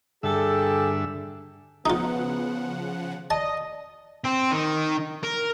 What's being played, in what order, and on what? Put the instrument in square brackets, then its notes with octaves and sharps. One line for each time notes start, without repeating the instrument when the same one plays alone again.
[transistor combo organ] G2 D3 E5 [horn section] G#4 A4 G5
[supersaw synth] C#3 F3 F#5 [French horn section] B3 [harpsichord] D#4 F4
[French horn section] D5 [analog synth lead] D#5 [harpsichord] A5
[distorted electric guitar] C4
D#3
A#4